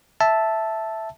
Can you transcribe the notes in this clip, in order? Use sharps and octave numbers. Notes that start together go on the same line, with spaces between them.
E5 A5